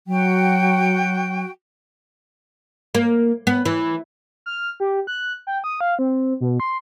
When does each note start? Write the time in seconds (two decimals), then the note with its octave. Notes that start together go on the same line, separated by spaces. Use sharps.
0.07 F#3 F#4 G5
2.95 A#3
3.47 B3
3.65 E3
4.46 F6
4.80 G4
5.07 F#6
5.47 G5
5.64 D#6
5.81 F5
5.99 C4
6.41 B2
6.60 C6